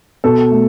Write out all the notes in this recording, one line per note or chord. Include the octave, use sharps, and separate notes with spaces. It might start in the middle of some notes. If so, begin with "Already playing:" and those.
B2 A4
A3